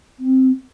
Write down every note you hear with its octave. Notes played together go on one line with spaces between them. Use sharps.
C4